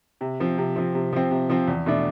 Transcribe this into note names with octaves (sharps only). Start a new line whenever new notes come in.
C3
F3 C4
C3
F3 C4
C3
F3 C4
C3
F3 C4
E2
B2 A3 D4